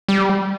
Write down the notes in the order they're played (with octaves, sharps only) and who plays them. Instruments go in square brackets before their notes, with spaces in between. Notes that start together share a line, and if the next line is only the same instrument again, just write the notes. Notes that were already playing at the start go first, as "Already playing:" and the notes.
[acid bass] G3